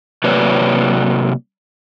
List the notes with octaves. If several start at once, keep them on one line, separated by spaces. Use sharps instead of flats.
C3 F#3 A#3 B4 C#5 D5